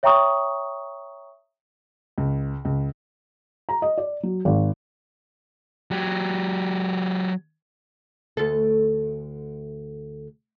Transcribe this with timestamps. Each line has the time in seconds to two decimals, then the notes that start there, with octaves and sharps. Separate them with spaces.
0.03 C#5 E5 G5 A#5 C#6 D#6
2.18 C#2
2.65 C#2
3.69 A#5
3.82 D#5
3.98 D5
4.23 F#3
4.45 G#1
5.91 F#3 G4
8.37 D2 A4